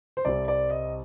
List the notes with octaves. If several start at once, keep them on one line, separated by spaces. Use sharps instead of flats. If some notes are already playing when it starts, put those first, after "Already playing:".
C5
C2 C3 G3 C4 D5
D5
D#5